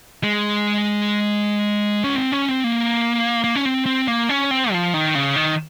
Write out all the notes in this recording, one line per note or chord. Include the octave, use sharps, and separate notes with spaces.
G#3
C#4
C4
C#4
C4
A#3
A#3
C#4
C4
C4
A#3
C#4
C4
F3
D#3
C#3
D#3